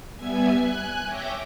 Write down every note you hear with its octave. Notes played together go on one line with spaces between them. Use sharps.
G3 B3 E5 G#5 G#6
G#5 F#6
C#5 E5 G5 D6 G6 A#6